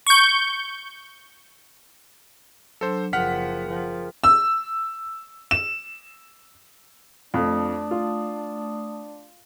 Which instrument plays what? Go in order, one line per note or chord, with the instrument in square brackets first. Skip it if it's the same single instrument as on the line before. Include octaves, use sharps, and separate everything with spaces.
[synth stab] C#6 G6
[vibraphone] F#3 D4 [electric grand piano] A4 C5
[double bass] F#1 F3 [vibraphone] G#4 A#4 G5 [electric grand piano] F#5 F6 B6
[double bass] F3
[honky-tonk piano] E6
E7
[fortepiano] F2 [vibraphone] A3 D#6 [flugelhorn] D4
[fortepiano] F4